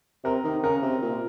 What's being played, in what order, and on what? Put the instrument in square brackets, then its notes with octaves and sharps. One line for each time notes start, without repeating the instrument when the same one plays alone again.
[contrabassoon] C3 [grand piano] A#4
[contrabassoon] D#3
[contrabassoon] C#3 [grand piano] A#4
[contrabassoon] C3
A#2